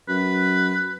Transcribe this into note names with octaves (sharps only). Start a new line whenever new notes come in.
F#2 B4